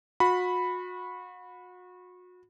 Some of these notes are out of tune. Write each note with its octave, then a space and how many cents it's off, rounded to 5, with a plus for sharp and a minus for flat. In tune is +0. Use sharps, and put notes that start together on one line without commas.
F#4 -35 B5 +0